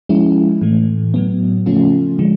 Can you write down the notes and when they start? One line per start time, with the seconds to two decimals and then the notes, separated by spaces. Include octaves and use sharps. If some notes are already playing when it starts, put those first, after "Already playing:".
0.09 F3 G#3 C#4 E4
0.61 A2 E3 A3
1.14 A2 F#3 B3
1.66 C#3 F3 A3 C#4 F4
2.19 D3 F3 G#3